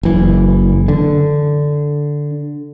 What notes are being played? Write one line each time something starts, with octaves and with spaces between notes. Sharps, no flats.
F#1 E3
D3